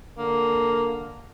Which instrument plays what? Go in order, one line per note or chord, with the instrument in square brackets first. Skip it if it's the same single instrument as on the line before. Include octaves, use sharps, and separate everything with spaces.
[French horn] D3 [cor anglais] A#3